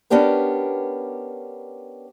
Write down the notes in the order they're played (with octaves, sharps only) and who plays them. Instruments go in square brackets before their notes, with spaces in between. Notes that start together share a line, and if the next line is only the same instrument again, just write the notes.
[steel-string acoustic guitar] B3 C#4 D4 G4 A#4 B4